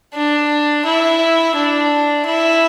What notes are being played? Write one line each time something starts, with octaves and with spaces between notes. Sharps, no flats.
D4
E4
D4
E4